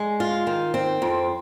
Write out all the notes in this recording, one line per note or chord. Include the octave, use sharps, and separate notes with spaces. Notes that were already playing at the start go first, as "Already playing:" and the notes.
Already playing: G#3
F4
D#3
C4
F2